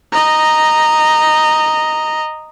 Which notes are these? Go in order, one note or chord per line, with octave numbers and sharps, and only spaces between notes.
D#5 A#5